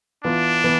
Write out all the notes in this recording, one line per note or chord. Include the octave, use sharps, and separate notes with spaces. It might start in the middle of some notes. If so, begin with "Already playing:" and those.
E3 B3 D4 F4
E3 B3